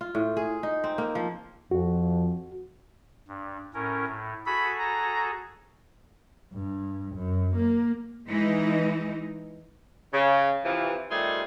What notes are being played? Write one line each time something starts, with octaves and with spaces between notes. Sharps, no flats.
F4
A2
G#4
D#4
C4
A#3
F3
F2 F#4
G2
A2 C#4 A#4
A2
F#4 G#4 A4 B5
A#5
G2
F#2
A#3
E3 G#3 D#4
C#3
C3 E3 F3
C3 D#3 G3 A3 F4 G#4